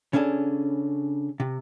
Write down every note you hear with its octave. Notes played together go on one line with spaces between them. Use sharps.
C#3 C#4 D4 A4 G#5
C3